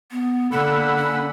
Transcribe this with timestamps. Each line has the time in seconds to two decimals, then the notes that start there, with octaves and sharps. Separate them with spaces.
0.11 B3
0.51 D3 A#3 A4 F#5 B5 E6
0.98 C#4